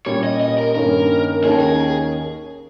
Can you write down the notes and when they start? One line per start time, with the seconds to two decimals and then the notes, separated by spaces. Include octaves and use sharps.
0.06 A#2 G3 C#4 C#5
0.23 D#5
0.41 D#5
0.58 A#4
0.75 G2 D#3 A#3 C#4 A#4
1.44 D#2 D#3 A#3 C#4 G#4
1.52 A#4
1.59 G#4